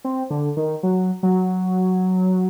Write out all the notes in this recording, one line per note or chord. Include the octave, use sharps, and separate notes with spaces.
C4
D3
D#3
F#3
F#3